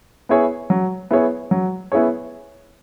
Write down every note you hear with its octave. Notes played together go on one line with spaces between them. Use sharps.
B3 E4 G#4 C#5
F#3
B3 E4 G#4 C#5
F#3
B3 E4 G#4 C#5